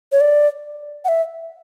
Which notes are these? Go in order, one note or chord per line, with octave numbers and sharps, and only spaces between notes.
C#5
D5
F#5
E5